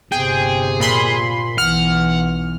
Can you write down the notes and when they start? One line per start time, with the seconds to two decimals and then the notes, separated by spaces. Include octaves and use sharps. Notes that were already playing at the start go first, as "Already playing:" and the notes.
0.12 G1 C3 G#4 G5
0.80 A#2 B5 C6
1.58 B1 E3 F#5 F6